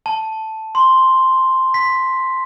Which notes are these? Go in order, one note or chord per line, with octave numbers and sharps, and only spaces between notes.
A5
C6
B6